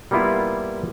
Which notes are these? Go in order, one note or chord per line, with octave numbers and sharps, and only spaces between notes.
G3 A#3 B3 E4 F4